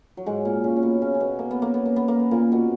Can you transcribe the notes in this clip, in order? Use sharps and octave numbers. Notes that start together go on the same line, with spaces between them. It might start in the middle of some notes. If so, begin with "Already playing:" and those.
F#3
G#2 G#3
A#2 A#3
C#3 C#4
C#4
B2 B3
C#3 C#4
C#4
B2 B3
A#3
B3
A#3
B3
A#3
B3
A#3
B3
A#2 A#3
B2 B3